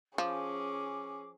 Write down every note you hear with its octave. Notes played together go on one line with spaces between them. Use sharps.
F3 C#4 G#4 D6